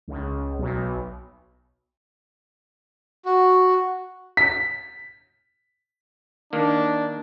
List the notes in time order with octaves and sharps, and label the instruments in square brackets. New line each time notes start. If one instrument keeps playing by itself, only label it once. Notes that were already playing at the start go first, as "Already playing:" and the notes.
[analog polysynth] C#2
B1
[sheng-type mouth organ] F#4
[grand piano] B6
[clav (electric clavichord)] D#3 A#3 [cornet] D4